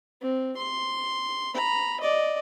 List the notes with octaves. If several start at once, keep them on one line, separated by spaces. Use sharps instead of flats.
C4
C6
A#5 B5
D5 D#5